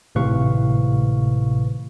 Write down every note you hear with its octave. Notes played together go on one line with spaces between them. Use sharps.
G#1 A2 C3 B4 F5 C#6